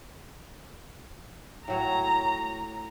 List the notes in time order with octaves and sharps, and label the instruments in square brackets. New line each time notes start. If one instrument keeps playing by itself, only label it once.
[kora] A2 F#3 C#5 [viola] A#5